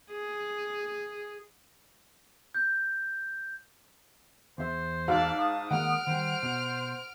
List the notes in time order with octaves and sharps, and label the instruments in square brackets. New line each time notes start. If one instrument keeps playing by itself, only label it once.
[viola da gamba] G#4
[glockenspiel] G6
[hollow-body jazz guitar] E2 E5 [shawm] C5
[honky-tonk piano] G#2 F5 E6 [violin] D5 A5
[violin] A5 [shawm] D#6
[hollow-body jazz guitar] D#3 G#3 A#3 [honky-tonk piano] F#5 [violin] F6 D7
[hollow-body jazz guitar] D#3 G3 [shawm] C5
[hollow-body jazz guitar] B2